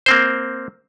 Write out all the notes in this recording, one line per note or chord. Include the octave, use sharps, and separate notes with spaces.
A#3 C4 C5